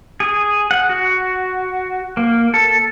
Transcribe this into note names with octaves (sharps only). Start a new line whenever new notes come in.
G#4
F#5
F#4
A#3
A4